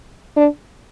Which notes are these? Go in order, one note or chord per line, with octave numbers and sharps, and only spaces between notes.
D4